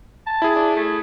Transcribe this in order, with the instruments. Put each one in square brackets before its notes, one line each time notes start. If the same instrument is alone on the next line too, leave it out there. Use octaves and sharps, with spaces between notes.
[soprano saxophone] A5
[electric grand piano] E4 G#4
[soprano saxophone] D4
A3